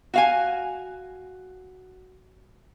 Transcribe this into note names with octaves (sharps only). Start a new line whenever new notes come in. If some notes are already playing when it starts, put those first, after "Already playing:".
F#4 F5 G#5